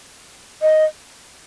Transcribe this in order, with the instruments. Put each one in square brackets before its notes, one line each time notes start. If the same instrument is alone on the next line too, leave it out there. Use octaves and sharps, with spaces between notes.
[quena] D#5